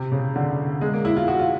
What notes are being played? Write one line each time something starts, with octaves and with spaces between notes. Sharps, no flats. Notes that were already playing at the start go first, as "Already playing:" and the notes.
Already playing: C3
C#3
D3
G#3
A#3
E4
F4
F#4
F4